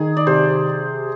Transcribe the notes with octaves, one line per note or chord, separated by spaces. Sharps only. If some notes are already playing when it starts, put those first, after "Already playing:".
Already playing: D#3 G#4
D5
C3 C5